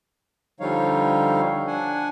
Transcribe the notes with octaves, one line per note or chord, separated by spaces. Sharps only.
D3 F3 G3 D#4 C#5 F5
D4 F#5 G#5